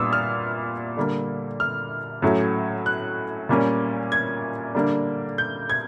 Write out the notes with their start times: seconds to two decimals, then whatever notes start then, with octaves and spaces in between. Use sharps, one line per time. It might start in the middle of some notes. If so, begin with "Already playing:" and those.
Already playing: A#2 G3 B3 D4 D#6 E6
0.13 F6
0.97 D3 G3 A#3
1.60 F6
2.22 A2 F#3 A3 C#4
2.86 F#6
3.49 A#2 G3 A#3 C#4
4.12 G#6
4.75 D3 G3 A#3 D4
5.38 G6
5.70 G#6